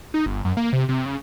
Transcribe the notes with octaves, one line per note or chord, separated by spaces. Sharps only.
D#4
G1
F#2
A#3
C3
C3
C#3